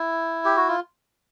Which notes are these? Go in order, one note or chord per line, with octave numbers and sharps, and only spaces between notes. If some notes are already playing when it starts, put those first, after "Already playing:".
Already playing: E4
G4
F#4
F4